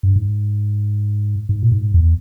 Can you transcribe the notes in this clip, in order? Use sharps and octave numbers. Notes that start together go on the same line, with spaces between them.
G2
G#2
G#2
A#2
G#2
E2